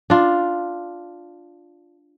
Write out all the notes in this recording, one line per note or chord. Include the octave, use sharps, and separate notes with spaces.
D4 F4